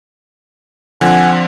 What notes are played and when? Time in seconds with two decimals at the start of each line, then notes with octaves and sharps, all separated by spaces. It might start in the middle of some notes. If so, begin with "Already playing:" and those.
1.01 D3 F3 C4 F#5 G#5